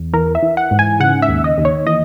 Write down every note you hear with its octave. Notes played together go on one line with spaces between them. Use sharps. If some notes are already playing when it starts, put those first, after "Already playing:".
Already playing: E2
E3 A#4
E5
E3
F#5
G#2
G#5
C#3 F#5
E5
D#2
D#5
D#2
C#5
E3 D#5